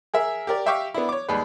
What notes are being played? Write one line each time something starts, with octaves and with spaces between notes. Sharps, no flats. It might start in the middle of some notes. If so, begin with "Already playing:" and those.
G#4 A#4 E5
G4 A#4 D5
G4 E5 F5 G5 C#6 D6
B3 D4 E4
C#5 D6
D#2 G3 G#3 B4